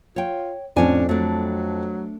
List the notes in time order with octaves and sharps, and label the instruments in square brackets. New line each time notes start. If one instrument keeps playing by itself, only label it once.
[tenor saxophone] F4 [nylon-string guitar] C#5 G5
[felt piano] F2 [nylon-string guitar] A2 C#4 G#5 [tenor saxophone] D4
[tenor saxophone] F#3 [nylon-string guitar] A3 D4